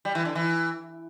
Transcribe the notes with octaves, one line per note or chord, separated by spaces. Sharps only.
G3
E3
D3
E3